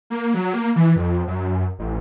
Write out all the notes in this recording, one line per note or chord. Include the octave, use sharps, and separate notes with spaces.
A#3
F#3
A#3
E3
F2
F#2
A1